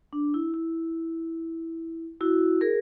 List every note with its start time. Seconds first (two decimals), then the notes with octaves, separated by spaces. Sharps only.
0.13 D4
0.34 E4
0.54 E4
2.21 E4 F#4
2.61 G#4 A#4